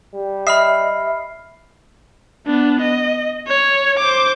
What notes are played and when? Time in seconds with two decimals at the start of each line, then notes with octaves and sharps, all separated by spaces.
0.14 G3
0.47 D#5 E5 B5 F6 C7
2.46 B3 D4
2.82 D#5
3.47 C#5
3.99 C5 D6